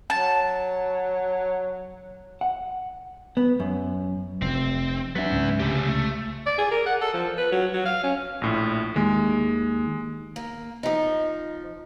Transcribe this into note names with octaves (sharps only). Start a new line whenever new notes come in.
F#3 A5
F#5
B3
F#2
F1 C3 C4
F#3 B3 D4 E5
C#2 G#2 C#4
C#2 C3 A3 G4
A3
D5
G#4
A#4
F#5
A4
F3
B4
F#3
F#3
F5
C#4
A#1 A2
D#2 G#3
A#3
F3 D#4